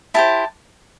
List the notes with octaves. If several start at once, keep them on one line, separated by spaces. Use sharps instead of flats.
E4 G4 C5 A5